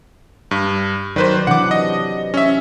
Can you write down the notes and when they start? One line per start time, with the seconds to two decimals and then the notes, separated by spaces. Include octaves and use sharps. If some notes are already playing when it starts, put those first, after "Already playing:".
0.51 G2
1.16 D#3 F#3 B4 C5 D5
1.47 C3 E3 D4 F#5 D6
1.71 D#5
2.34 C#4 E5